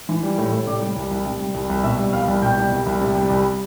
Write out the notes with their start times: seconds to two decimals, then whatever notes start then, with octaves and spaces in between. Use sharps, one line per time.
0.09 E3
0.23 G3
0.38 A2
0.52 A2
0.67 C3 D5 D6
0.81 G3
0.96 C2
1.11 C2
1.26 C3
1.40 G3
1.54 C2
1.69 C2
1.84 B2 E5 E6
1.99 G3
2.13 C2 F5 F6
2.28 C2
2.42 B2 G5 G6
2.57 G3
2.72 C2
2.86 C2
3.01 C3
3.15 G3
3.30 C2